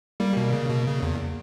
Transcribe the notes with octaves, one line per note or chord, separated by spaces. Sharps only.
G3 A#3
B2
C#3
B2
C#3
E2